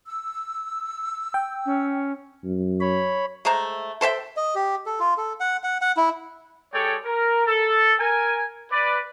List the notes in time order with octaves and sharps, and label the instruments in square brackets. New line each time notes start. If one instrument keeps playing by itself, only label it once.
[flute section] E6
[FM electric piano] G5
[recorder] C#4
[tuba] F#2
[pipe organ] C#5 B5
[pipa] G#3 A3 C5 A#5
A4 C5 E5 G5
[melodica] D#5
G4
A4
F4
A4
F#5
F#5
F#5
E4
[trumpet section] G#3 G4 A4 C#5 D5 G5
A#4
A4
A#4 G#5
B4 D5